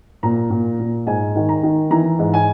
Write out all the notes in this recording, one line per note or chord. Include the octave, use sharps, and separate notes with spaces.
A#2 A#5
A#2
A#2
G#2 G#5
D#3
A#5
D#3
E3 A#5
G#2
G#5